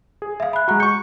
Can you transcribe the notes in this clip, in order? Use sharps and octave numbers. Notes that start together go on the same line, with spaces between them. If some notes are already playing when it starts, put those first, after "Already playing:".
G#4
E5 F5
B5 F#6
G#3 F#4 F#5 A#5 F#6
C#6 G6 C#7